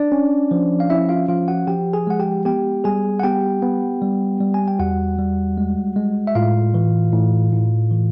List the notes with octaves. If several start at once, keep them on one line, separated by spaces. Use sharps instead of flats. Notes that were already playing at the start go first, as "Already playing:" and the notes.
Already playing: D4 D5
C#4
F3
F5
C#4 E4 E5
F4 F5
F3 F4 F5
F#4 F#5
F3 G4 G5
G#4 G#5
G#3 F#5
G4 G5
B3 G4 G5
G3 G#4 G#5
F#5
B3 G4 G5
B3
G3
G3
G#5
G5
E2 F#4 F#5
G3
G#3
G#3
E5
A2 F4 F5
E3
A2
A2
E3